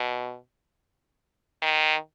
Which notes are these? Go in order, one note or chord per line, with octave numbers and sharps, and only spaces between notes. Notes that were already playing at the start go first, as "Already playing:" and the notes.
Already playing: B2
D#3